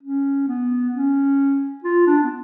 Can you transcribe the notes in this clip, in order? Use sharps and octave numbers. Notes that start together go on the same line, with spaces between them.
C#4
B3
C#4
F4
D4
B3